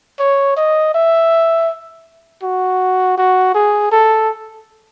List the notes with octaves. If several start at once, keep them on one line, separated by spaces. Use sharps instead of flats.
C#5
D#5
E5
F#4
F#4
G#4
A4